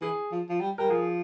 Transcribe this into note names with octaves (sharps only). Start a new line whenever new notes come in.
E3 G#4
F3
F3
G3
G3 A#4
F3 G#4